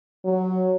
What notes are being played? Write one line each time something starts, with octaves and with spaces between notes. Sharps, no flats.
F#3